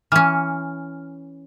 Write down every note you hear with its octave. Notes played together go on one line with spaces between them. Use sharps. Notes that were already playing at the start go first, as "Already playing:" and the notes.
E3 C#4 F6